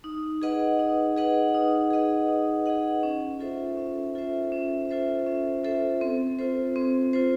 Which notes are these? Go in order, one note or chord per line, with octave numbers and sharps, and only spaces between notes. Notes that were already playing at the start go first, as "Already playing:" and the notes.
D#4
G#4 B4 D#5 F#5
D#4
G#4 B4 D#5 F#5
D#4
G#4 B4 D#5 F#5
D#4
G#4 B4 D#5 F#5
C#4
F4 A4 C5 E5
C#4
F4 A4 C5 E5
C#4
F4 A4 C5 E5
C#4
F4 A4 C5 E5
C4
F4 A4 C5
C4
F4 A4 C5